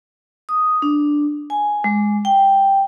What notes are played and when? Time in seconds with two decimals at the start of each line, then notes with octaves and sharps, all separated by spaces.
0.49 D#6
0.82 D4
1.50 G#5
1.84 G#3
2.25 G5